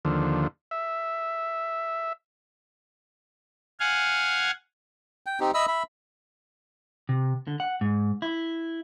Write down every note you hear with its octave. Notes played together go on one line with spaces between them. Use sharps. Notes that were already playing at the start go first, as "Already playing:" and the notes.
D#2 D3 F3
E5
F5 F#5 G#5
G5
C4 D#4 G4
D#5 E5 B5 E6
E5 B5
C3
D3
F#5
G#2
E4